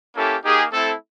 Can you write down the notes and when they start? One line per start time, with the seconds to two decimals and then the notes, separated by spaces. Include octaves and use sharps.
0.16 A#3 C#4 E4 G4 A4
0.44 A#3 D#4 G4 G#4
0.72 A3 C4 E4 A4